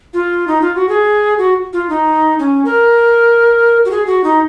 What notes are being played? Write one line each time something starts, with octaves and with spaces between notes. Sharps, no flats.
F4
D#4
F4
F#4
G#4
F#4
F4
D#4
C#4
A#4
F#4
G#4
F#4
D#4